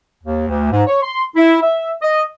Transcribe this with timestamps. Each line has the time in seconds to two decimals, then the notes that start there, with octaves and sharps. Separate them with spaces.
0.24 D#2
0.48 D2
0.71 G#2
0.87 C#5
1.03 C6
1.36 E4
1.62 E5
2.02 D#5